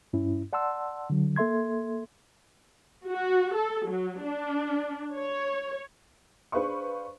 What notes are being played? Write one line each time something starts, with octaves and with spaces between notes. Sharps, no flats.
G2 C#4 E4
D5 F#5 A5 C6 E6
D3 F#3
A#3 A4 E5 C6 G#6
F#4
A4
F#3
D4
C#5
D4 G#4 B4 C5 F5 C#6